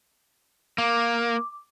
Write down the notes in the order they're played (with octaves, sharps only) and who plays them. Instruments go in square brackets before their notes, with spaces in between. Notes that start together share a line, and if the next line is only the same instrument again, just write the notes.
[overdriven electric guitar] A#3 [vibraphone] D6